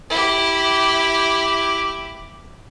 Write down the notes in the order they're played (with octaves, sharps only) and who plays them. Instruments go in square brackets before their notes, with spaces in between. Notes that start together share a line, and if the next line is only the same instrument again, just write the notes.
[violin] E4 G4